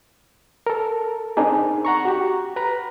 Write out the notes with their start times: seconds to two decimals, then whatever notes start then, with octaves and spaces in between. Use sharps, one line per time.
0.67 A4 A#4
1.37 C4 D4 D#4 G#4
1.85 F#5 A#5 C#6
2.05 F#4 G4
2.56 B4 A#5 B5